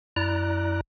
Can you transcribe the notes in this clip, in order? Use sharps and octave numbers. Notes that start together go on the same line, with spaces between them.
F#2 E4 D5 A#5 F#6